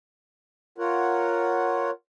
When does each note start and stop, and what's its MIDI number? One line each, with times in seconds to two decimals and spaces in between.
0.78 1.90 65
0.78 1.90 70
0.78 1.90 73
0.78 1.90 78